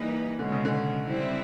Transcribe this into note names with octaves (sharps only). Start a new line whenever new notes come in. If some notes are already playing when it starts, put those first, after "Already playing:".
Already playing: E3 G3 A#3 D#4 B4
B2 D3 G#3 C#4
C#3
D3
G3 C4 E4